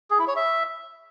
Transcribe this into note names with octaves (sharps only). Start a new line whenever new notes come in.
G#4
E4
C#5
E5